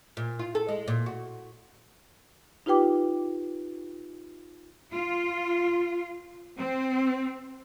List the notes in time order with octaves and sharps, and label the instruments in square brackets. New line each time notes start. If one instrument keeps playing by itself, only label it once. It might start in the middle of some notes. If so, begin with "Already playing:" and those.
[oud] A#2
F4
A4
G#3
A#2
F#4
[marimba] D#4 F4 G4 B4 G5 D6
[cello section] F4
C4